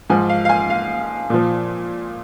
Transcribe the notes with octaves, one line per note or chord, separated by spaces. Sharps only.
G#2 F3 G#5
F5
F5
G#5
F5
A#2 F3